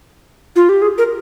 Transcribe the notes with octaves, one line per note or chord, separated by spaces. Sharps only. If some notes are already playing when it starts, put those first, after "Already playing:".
F4
G4
G#4
A#4